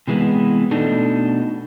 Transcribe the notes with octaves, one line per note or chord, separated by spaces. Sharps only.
C3 E3 G#3 B3
B2 A3 D4 D#4 A4 D#5